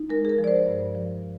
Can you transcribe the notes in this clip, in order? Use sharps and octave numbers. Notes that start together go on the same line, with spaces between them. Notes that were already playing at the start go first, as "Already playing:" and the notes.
Already playing: D#4
G#3 A#4
G#4
A#4
F3
D5
C5
G2
F3